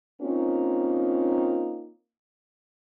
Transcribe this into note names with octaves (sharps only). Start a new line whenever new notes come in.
A#3 C4 C#4 D#4 F4